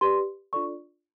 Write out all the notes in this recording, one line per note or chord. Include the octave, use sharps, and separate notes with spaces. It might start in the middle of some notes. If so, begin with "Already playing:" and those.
G4 B4 D5 C6
D4 F4 A4 D5 C#6